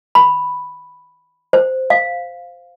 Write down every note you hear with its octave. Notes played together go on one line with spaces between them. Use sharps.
B5
C5
F5